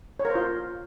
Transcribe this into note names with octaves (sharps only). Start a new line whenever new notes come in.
C#5
A#4
C5
F4